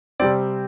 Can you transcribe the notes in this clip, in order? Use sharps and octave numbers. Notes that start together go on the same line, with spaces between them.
C3 G3 C4 D5